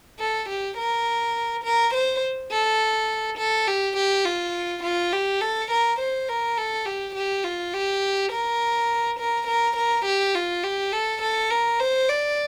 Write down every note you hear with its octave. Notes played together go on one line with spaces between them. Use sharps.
A4
G4
A#4
A#4
C5
A4
A4
G4
G4
F4
F4
G4
A4
A#4
C5
A#4
A4
G4
G4
F4
G4
A#4
A#4
A#4
A#4
G4
F4
G4
A4
A4
A#4
C5
D5